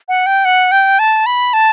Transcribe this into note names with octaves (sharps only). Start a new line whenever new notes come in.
F#5
G5
F#5
G5
A5
B5
A5